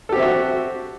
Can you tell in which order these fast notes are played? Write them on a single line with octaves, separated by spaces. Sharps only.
A4 G4 C4 E5 F#4